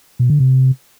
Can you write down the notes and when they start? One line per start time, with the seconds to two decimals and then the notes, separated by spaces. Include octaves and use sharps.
0.19 B2
0.30 D3
0.40 C3